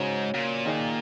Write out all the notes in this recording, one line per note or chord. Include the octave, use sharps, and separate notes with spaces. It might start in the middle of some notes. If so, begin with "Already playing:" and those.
Already playing: G#2 C#3 F#3 C#4
A#2
D#3 A#3 D#4 G#4